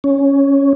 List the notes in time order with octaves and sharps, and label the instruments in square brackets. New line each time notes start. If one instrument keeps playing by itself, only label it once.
[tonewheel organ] C#4